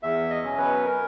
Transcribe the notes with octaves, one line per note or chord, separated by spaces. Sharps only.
E2 E5
D#5
B2 F#3 C#4
B4
A#4